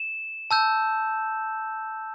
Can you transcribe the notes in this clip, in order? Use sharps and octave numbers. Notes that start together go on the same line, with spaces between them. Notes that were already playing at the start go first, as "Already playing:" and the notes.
Already playing: E7
A5 E6 G6